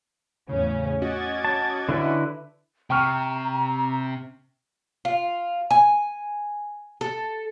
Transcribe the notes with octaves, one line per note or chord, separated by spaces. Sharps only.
E2 A2 C#3 C#4
C#4 F#4 D#5 D6 G#6 A6
A5
D3 E4 B4
C3 G5 A#5 C#6 F6
F4
G#5
A4